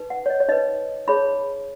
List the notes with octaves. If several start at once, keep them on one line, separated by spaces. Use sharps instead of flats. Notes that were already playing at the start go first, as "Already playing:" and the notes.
Already playing: D#4 B4
F#5
C#5
D#5
C#5
D#4 B4 D#5
D#4 G#4 C#5 B5